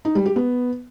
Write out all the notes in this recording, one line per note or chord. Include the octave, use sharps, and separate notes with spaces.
D#4
G3
G4
B3